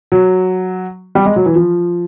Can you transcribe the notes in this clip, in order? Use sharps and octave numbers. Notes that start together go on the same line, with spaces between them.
F#3
G3
G#3
F#3
E3
F3